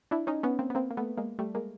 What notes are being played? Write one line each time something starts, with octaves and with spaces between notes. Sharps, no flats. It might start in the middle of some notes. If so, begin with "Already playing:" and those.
D4 E4
C#4 D#4
B3 C#4
A#3 C4
B3
A#3 C4
A#3
A3 B3
G#3 A#3
G3 A3
G#3 A#3